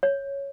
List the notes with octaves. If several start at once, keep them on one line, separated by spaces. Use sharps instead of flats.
C#5